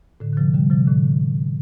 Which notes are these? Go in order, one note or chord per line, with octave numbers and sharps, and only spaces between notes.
A2 D3
D3
C3 F3
D3 G3
C3 F3
A2 D3